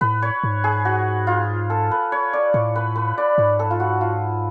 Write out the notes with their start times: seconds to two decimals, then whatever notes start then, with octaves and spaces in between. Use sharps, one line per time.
0.01 A2 B4
0.22 C#5
0.44 G#2
0.64 G#4
0.85 F#4
1.27 F4
1.70 A4
1.91 B4
2.12 C#5
2.33 D5
2.54 A2 C#5
2.76 B4
2.96 B4
3.18 D5
3.38 G#2 C#5
3.59 A4
3.71 F4
3.80 F#4
4.01 F4